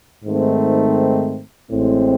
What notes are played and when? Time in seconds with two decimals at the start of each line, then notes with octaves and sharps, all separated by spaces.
0.24 G#2 D#3 A3 C4
1.71 A1 A2 G#3 C4